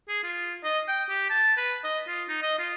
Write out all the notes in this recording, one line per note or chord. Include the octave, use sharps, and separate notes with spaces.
G#4
F4
D#5
G5
G4
A5
B4
D#5
F4
D#4
D#5
F4